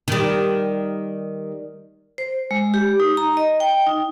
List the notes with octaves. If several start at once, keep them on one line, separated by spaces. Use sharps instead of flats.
D#3 G3
C5
G#3
G4
D#4
A#5
D#5
G5
D#4